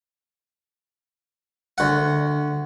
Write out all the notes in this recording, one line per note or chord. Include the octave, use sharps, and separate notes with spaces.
D2 F#5